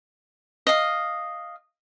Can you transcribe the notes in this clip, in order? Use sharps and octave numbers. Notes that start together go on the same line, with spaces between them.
D#5 F5